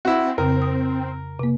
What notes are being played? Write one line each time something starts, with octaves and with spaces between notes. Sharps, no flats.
C4 E4 F#4
F2 C#3 A#4
D#6
C3 A#3